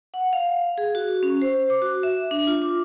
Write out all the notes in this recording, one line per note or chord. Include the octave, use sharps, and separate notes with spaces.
F#5
F5
G#4
F#4
C#4
C5
D6
F#4
E5
D4
F4
D6